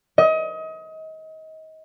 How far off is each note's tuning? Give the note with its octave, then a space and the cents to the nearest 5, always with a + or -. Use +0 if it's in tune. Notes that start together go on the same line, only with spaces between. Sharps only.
D#5 +30